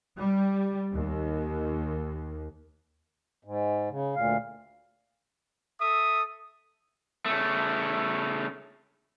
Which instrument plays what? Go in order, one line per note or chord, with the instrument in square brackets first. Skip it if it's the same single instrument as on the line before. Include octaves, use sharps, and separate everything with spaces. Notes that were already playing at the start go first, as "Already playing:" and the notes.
[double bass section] G3
D#2
[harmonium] G#2
C#3
D2 A#2 F5
[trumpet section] A4 E5 D#6
[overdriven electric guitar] C#3 A3